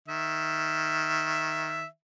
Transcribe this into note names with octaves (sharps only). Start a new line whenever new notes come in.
D#3 E5